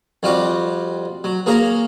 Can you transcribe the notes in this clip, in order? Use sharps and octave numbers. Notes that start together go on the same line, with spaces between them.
F2 G3 F4 F#4 D6
F#3
A#3 G#4 C#5 F5 G#5 A#5